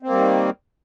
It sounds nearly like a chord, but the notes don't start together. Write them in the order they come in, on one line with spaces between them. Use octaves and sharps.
C4 A#3 G3 D#3